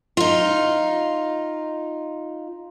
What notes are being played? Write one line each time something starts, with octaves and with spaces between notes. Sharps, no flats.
D#4 F4